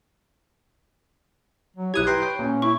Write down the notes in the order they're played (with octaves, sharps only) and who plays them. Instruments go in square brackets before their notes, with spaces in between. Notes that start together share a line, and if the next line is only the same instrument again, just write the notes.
[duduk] F#3
[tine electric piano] B1 D#6 G#6 [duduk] E4 [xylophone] G4 F#6
[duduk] B4 [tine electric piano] G5 A#5 C6
[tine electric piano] C#5 G5
[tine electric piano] A#2 [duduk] C#4
[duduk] E4 [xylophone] C#6